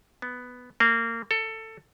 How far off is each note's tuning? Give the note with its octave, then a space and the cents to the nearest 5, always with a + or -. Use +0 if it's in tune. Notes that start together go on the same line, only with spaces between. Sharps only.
B3 +5
A#3 -25
A4 +15